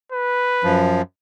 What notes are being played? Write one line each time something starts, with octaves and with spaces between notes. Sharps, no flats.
B4
F#2 F3